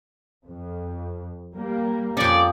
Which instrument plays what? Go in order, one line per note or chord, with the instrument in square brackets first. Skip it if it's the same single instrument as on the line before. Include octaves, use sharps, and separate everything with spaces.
[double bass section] F2
G3 A#3
[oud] F2 C#4 [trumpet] D5